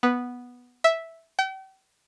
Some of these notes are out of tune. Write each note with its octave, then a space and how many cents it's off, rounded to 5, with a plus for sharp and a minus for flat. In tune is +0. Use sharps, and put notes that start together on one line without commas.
B3 -5
E5 -5
G5 -40